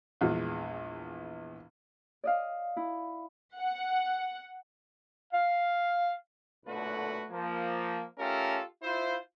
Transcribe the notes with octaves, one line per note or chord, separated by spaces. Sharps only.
A#1 E2 E3 G#3
D5 D#5 F5
E4
F#5
F5
B1 A#2 D3 A3 F#4 B4
F3 A#3
A3 C#4 F4 G4 A4 A#4
E4 F4 C5